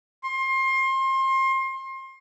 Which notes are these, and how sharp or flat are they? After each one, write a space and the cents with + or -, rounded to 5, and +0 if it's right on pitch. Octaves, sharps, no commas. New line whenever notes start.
C6 +30